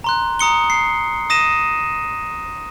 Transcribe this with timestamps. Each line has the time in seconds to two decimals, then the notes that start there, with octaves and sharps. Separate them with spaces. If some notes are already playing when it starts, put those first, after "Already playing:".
0.04 A#5 C6 F#6
0.39 A#5 D#6 C#7 G7
0.70 C7
1.30 D#6 A#6 D#7 E7